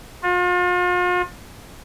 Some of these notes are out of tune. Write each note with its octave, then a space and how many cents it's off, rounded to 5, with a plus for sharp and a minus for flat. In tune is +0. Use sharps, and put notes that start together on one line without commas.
F4 +40